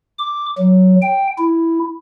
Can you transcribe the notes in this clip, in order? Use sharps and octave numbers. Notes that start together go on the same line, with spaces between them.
D6
F#3
G5
E4